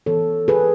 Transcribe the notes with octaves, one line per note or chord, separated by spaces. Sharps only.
E3 B3 A4 C#5
G#4 B4